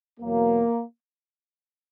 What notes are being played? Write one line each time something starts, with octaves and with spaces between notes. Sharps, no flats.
E2 B2 F#3 A#3